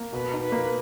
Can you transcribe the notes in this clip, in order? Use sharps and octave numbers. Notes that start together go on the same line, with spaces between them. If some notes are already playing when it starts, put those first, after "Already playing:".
Already playing: A#3
B2 B4
D#4
B4
A#3